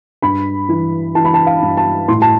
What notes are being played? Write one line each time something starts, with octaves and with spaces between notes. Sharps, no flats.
G2 B5
E3
E3 A5
B5
A5
F5
G2
A5
A2 C6
A5